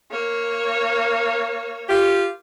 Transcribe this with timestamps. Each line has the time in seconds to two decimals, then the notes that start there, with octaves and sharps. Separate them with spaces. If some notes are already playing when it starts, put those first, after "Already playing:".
0.11 A#3 C#5
1.89 F4 G4